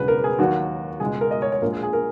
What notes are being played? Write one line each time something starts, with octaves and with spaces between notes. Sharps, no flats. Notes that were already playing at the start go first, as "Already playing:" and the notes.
Already playing: E1 E2 C#3 F#3 B4
A#4
G#4
D#2 D#3 F#3 F#4
C#2 B2 G#3 G#4
A#4
D#5
C#5
C#5
A#1 A#2 G#3 A#4
G#4
G#4
A#4